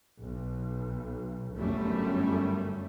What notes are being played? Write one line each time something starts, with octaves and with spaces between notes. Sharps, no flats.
B1
G1 F#2 G3 A3 C#4